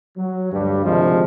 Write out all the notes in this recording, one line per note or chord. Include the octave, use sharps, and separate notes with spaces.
F#3
D2 G2 G3
D2 C3 D#3 F3 G#3